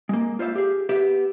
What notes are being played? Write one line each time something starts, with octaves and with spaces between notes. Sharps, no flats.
G#3 A#3
F4 C5 C#5 E5 F5
G4 G#4
B3 G4 E5